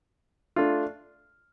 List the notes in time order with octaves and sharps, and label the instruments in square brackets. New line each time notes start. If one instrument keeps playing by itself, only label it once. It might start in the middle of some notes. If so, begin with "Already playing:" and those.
[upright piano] A3 D4 F4